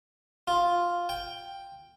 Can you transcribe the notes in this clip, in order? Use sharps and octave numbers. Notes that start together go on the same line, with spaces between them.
F4
G5